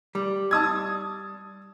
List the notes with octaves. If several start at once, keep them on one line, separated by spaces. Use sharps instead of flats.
G3
A5 D#6 G#6